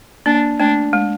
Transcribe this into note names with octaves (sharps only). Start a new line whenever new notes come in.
A#3 D4
A3 D4
G#3